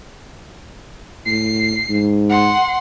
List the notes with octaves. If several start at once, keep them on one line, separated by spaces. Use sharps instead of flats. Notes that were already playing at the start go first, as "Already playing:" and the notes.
A2 C7
G#2
F#5 C6